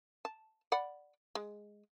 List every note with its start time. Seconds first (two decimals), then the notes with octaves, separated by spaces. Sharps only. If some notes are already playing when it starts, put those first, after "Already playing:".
0.25 A5
0.72 D5 F#5 B5
1.35 G#3